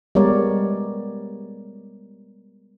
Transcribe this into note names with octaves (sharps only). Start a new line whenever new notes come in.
G3 G#3 B3 A#4 C#5 D5